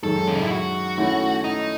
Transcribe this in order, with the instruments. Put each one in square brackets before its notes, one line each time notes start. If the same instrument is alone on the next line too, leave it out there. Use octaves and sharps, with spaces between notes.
[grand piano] F#2 D#3 G#3 [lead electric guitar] A4
[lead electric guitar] C#4
D#4
E4
F#4
[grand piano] D#3 A3 C#4 E4
[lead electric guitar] D#4